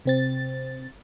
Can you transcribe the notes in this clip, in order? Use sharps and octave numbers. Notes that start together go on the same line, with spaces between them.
C3 C4 A6